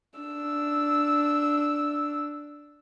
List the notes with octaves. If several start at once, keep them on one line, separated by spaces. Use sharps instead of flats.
D4 E6